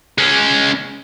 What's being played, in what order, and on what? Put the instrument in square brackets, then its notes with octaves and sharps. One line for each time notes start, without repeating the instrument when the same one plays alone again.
[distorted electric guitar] G#3 C#4